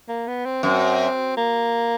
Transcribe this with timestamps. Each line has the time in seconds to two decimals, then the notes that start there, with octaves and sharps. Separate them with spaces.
0.08 A#3
0.27 B3
0.45 C4
0.63 F#2 C4
1.37 A#3